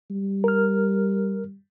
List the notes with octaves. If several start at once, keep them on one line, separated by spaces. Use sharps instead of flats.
G3
A#4 F6